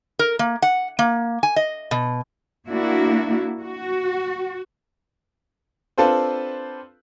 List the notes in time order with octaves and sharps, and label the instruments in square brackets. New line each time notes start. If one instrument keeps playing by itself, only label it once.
[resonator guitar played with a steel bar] A#4
A#3
F#5
A#3
G#5
D#5
B2
[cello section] A#3 D4 E4 F#4
F#4
[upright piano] C4 D4 F4 A4 B4 C5